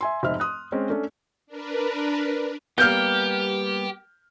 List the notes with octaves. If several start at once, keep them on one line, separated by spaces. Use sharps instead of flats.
E5 G#5 C6
F1 G#2 C5 E5 F6
C6 D#6 F#6
G#3 C4 C#4
A3 C#4 D4
D4 A#4 B4
G3 A#3 B3 G4 F6 G6